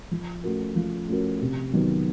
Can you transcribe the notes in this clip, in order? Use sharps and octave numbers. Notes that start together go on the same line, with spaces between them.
F3
A3 C#4 F#4 A#4
F3
A3 C#4 F#4 A#4
C3
D#3 F#3 B3